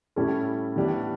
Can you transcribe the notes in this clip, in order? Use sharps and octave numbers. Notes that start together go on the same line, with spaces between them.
A2 G3 C#4 E4 A4
A2 E3 G3 B3 D4